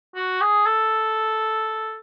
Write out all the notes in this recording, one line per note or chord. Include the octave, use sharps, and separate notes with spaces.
F#4
G#4
A4